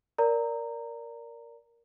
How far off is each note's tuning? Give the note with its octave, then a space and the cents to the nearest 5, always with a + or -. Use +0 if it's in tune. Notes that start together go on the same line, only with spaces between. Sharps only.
A#4 +0 D5 -15 A#5 -15